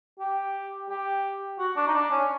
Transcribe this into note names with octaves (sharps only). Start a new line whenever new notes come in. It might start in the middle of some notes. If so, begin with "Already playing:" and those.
G4
G4
F#4
D4
D#4
D4
C#4